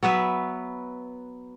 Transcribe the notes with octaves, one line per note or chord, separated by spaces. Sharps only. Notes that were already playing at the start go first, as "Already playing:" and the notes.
F#3 B3 B4 E5